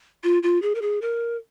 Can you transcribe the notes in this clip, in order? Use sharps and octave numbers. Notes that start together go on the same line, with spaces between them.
F4
F4
G#4
A#4
G#4
A#4